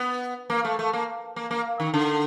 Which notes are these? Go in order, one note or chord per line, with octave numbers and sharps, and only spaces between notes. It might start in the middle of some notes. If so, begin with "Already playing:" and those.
Already playing: B3
A#3
A3
A3
A#3
A#3
A#3
D#3
D3